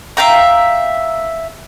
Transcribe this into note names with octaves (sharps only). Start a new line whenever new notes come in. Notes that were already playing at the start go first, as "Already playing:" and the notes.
E5 F5 G5 A#5